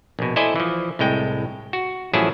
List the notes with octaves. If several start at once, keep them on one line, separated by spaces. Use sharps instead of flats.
A#1 B2
E4 A4 C5 D5 D#5 G#5
E3 F3
C2 A2 G#3 G5
F#4
A1 F3 F#3 E4 G#4 A5